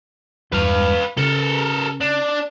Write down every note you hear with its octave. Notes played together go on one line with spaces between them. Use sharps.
E2 G2 E3 B4 F5
C#3 A4 A#4
D4